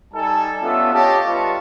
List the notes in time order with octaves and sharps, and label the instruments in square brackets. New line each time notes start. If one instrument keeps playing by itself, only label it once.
[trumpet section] G3 D#4 A4 G#5 A5
B3 C#4 D4 F4 A4 E5
G4 C#5 D#5 F5 A5
G3 F4 B4 A5 C#6